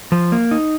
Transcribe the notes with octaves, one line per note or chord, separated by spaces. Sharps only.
F3
A#3
D#4